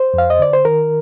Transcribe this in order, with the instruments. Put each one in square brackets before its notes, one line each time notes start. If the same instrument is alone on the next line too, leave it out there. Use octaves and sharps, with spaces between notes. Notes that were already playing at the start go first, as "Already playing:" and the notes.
Already playing: [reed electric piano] C5
F2 F5
D#5
D3 D5
C5
D#3 A#4